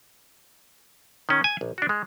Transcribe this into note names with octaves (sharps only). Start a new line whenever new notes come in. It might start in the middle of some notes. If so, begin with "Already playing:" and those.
D#3 C#4
G#5
A#1
D4 F#4
G#3